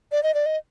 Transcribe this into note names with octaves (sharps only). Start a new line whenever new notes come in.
D5
D#5
D5
D#5